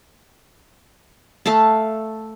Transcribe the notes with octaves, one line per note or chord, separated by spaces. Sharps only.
A3 A4 F5 A5